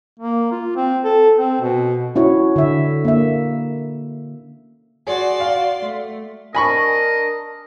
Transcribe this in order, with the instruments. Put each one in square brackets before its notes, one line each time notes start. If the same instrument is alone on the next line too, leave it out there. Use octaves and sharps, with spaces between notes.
[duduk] A#3
F4
C4
A4
C4
B2
[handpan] C#4 E4 F#4 C#5
D3 E5
A#3 E5
[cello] F#4 [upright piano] G#4 [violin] D5 C6
[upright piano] F5
[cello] A3
[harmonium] D4 A#4 [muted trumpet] D#5 [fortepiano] G#5 B5 C#6